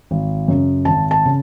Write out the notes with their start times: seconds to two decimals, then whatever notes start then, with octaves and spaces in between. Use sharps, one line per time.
0.11 G#1
0.48 F#2 C#3
0.85 G#1 A5
1.11 A5
1.26 C#3